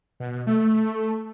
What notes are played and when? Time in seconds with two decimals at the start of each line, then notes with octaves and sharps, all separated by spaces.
0.20 B2
0.47 A3